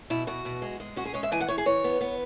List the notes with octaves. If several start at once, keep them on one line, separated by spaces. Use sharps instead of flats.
B2 E4
B2 F#4
B2
G#3
G#3
C#4 F#4
G#4
G#3 C#5
E5
E3 G#5
F#5
E3 C#5
G#4
E3 C#5
B3
B3